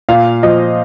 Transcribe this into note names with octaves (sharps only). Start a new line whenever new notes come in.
A#2 F5
F3 D#5